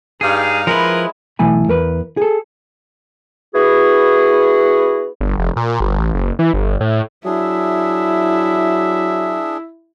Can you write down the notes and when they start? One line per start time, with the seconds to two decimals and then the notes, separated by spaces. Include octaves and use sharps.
0.21 G2 D#4 G#4 F5
0.67 F3 G#3 E4 A#4 B4
1.39 B1 E3 A3 G#5 B5
1.68 E2 A#4 B4
2.17 G#4 A4
3.54 B3 E4 F#4 G#4
5.21 G1
5.39 F1
5.56 A#2
5.80 G1
5.99 A1
6.14 F#1
6.39 E3
6.53 G1
6.81 A2
7.25 F#3 D4 E4 G#4 E5